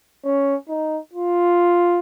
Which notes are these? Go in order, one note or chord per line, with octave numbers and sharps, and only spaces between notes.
C#4
D#4
F4